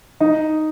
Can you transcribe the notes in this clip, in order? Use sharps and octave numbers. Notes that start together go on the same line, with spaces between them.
D#4